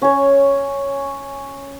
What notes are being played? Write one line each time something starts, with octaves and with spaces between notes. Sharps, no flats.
C#4 C#5